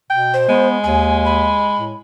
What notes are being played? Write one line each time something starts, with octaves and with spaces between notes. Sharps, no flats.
B2 G5
C5
G#3 B3
D#2 G#5
B5
A2